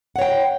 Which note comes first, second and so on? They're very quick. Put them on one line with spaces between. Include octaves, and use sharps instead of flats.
F#5 C#5 G5